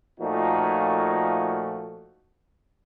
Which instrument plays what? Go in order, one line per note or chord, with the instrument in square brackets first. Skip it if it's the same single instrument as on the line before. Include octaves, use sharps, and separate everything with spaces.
[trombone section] A#2 F3 A3 D#4 F#4